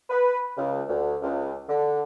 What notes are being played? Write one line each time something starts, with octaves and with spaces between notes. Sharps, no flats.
B4
C#2
D2
C#2
D3